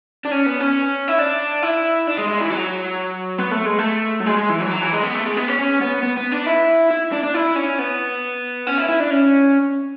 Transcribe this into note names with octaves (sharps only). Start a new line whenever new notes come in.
D4
C#4
B3
C#4
E4
D4
E4
D4
G#3
G#3
E3
F#3
B3
A3
G#3
A3
F#3
G#3
G#3
E3
F#3
E3
F#3
E3
G#3
B3
A3
G#3
B3
C#4
C#4
B3
B3
B3
D4
E4
E4
D4
D4
E4
C#4
B3
C#4
E4
E4
D4
C#4